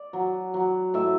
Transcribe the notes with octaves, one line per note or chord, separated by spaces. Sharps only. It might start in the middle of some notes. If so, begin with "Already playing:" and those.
Already playing: D5
F#3
F#3
A2 E5